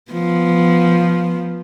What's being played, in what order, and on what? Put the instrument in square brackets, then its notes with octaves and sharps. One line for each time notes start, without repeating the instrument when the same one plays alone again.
[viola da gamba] F3 B3